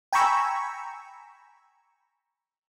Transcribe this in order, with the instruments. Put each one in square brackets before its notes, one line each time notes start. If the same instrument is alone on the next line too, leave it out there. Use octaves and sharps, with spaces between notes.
[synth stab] G5 G#5 A#5 B5 C#6 E6